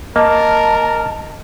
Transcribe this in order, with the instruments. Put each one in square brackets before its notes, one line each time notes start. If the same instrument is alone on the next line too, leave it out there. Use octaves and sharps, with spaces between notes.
[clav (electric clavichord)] A#3 [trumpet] A#4 [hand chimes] D#5 [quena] A5